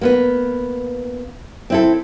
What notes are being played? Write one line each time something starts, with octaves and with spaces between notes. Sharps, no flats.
A#3 B3 B4
C4 E4 A4